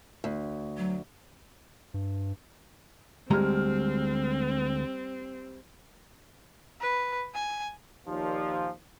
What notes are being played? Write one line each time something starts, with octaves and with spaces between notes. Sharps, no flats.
D2
F#3
G2
D2 G3 G#3 C4 A#5 F6
B4
G#5
D#2 A#2 F3